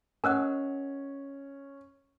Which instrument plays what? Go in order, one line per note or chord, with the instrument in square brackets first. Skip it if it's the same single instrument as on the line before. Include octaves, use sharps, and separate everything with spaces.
[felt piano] C#4 [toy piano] A#4 D#5 F#5 [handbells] G#5 E6 F#6